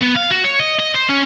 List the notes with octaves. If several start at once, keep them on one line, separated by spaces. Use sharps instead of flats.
B3
F5
F#4
C#5
D#5
D#5
C5
C#4